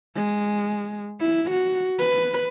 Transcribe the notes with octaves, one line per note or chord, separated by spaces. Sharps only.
G#3
E4
F#4
B4